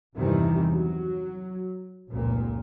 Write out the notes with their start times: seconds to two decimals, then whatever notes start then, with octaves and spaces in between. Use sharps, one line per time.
0.15 E2 G2 C3 D#3 E3 G3
0.69 F#3
2.10 F1 C#2 A#2